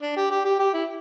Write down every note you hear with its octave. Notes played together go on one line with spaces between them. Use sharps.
D4
G4
G4
G4
G4
E4